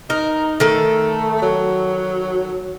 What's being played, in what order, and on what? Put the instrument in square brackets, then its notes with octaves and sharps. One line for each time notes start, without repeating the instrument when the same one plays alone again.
[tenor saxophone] D#4 [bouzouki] A#4
[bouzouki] D#3 A4 [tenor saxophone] A3
[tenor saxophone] F#3